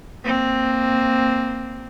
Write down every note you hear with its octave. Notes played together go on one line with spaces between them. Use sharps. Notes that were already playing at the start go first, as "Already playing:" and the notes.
A#3 C4